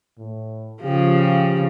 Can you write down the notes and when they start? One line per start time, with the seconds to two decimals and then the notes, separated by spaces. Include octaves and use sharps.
0.18 A2
0.83 C#3 F3 G4